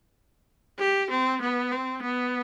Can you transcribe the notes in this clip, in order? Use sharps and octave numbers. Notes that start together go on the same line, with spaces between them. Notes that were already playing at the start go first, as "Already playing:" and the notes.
G4
C4
B3
C4
B3